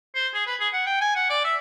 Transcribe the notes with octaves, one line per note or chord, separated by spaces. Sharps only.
C5
G#4
B4
G#4
F#5
G5
G#5
F#5
D5
E5